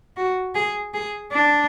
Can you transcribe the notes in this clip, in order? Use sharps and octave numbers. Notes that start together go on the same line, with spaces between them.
F#4
G#4
G#4
D4